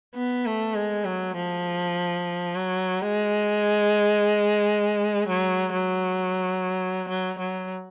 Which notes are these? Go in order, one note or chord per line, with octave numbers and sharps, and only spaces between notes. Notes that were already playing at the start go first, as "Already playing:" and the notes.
B3
A3
G#3
F#3
F3
F#3
G#3
F#3
F#3
F#3
F#3